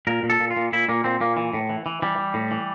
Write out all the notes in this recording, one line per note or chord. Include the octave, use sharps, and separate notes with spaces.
A#2 A#4
A#2
A4
A#2
F4
A#2
A#2 E4
A#2 A#3
A#2 C4
A#2 A#3
E3
A2
E3
E3
E3 G3
E3
A2
E3